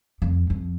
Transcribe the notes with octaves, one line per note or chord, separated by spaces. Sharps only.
F2
F2